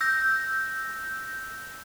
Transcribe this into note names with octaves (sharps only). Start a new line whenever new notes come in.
E6 G6 A#6